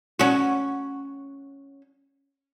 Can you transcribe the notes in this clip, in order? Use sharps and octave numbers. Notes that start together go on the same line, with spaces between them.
C#4 F#4